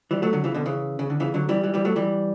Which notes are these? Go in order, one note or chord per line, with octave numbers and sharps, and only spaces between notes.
E3 G3
F#3 A3
D3 F#3
C#3 E3
B2 D3
C#3 E3
C#3
D3
C#3 E3
D3 F#3
E3 G3
E3 G3
E3 G3
F#3 A3
E3 G3